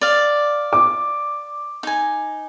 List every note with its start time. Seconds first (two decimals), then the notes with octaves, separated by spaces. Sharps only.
0.01 D5 F5
0.73 D6
1.83 D#4 G#5